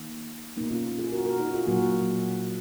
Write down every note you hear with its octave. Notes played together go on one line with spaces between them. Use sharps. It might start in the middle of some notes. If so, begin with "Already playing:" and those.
Already playing: D#3 A#3
B2 A#3 B3 D#4
C#4 F4
F4 G#4
F#4 A#4
F#4 A#4
D#4 F#4
F4 G#4
A#2 F#3 A#3 F#4 A#4